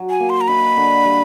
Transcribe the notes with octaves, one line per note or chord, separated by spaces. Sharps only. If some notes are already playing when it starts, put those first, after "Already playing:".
Already playing: F#3
G#5
A#3
C6
A#5
D#4 B5
D3
G3